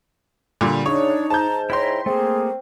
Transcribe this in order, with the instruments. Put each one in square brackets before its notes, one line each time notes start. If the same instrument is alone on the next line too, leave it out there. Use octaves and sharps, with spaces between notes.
[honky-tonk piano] A#2 D3 G3
[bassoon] C#3 [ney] D4 [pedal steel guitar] D#4 [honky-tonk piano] C#5
[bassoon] G#2 [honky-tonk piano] A5 G6 [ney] A#5
[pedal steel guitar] E4 G5 A#5 [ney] C#5 [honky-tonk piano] C6 B6
[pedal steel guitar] A3 A#3 [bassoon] C4 [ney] G#4